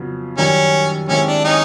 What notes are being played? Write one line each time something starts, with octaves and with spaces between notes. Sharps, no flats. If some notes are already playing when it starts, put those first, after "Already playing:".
Already playing: F2 C#3 F#3 B3
F#2 D#3 G3 C#4
D#3 G#3 C4 C#4 E4 G4
D4
C#4 D#4